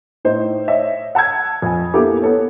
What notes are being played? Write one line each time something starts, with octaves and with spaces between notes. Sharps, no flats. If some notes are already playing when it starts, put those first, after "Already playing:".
A2 D#4 C5
C#5 D#5 E5
F#5 A5 E6 G#6
F2 G#5
A#3 B3 E4 G4 A4
B3 A4 C#5